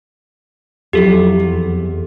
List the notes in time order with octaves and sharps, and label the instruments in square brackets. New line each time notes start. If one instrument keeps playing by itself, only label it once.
[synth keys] F2 [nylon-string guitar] F#3 E4 [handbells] G4 A4
[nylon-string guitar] E2